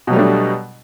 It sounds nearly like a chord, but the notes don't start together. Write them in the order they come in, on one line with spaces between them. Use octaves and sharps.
B2 F#3 G3 A3 D4